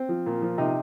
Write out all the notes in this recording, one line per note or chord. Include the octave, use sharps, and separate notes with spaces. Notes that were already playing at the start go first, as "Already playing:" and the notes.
Already playing: C4
F3
A#2
F3
C3 D#4